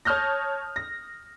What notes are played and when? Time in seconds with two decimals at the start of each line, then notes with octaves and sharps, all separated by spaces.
0.05 C#5 A5 D#6 F6 G6 A#6
0.76 A#6